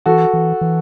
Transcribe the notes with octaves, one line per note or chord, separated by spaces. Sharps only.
E3 F#4 A4
E3
E3